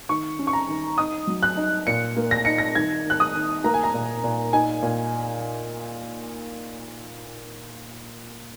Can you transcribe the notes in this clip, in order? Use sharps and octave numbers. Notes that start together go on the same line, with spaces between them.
D#3 C#6
C#4
C#6
A#5
D#3
D#4 D#6
F#3
F#6
D#4
A#2 C#7
A#3
A#6
D#4 C#7
A#6
D#3 G#6
D#3 F#6
D#6
D#3
A#3 A#5
G#5
A#5
A#2
A#2
D#4 G#5
A#2